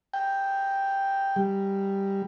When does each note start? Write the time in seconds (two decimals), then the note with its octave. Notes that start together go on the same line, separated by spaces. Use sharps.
0.14 G5
1.36 G3